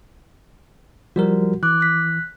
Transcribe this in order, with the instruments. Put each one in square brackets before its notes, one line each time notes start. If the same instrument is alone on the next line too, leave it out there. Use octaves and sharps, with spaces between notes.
[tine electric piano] F3 G3 A#4 [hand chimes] F#4
[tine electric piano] E3 [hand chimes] D6 F#6
[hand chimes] F#6 B6